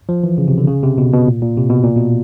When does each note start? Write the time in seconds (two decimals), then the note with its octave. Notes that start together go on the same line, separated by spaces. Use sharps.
0.09 F3
0.24 E3
0.38 C#3
0.48 C3
0.58 D3
0.68 C#3
0.83 C3
0.98 B2
1.13 B2
1.28 A#2
1.42 A#2
1.57 C3
1.70 B2
1.84 A#2
1.97 B2